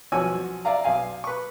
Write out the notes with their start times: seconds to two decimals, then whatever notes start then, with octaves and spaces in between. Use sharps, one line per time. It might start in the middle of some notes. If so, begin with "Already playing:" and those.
0.12 B1 F3 C#4 F#4 G#5 E6
0.65 D5 E5 F5 A#5
0.84 B1 F5 G#5
1.24 B4 C#6